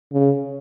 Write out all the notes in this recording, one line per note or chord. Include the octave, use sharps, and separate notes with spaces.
C#3